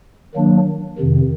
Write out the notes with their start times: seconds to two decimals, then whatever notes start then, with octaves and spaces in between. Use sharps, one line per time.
0.35 D#3 F#3 A#3 D4
0.98 F2 C3 D#3